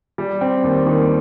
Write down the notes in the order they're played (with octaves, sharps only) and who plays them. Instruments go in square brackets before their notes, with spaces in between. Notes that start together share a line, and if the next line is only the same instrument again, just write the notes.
[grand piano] G3
C4
D#2
D#3